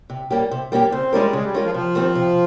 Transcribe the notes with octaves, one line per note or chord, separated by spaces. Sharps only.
C3
G3 A#3 C#4 G4
C3
G3 A#3 C#4 G4
C#3 C4
G3 G#3 C#4 F4 A#4
C#3 G#3
G3
G#3 C#4 F4 A#4
F3
C3 F3
D#3 G3 C4
C3